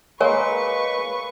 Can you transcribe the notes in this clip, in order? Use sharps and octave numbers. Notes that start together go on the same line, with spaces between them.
G#3 A#3 A#4 B4 C#5 G#5 C#6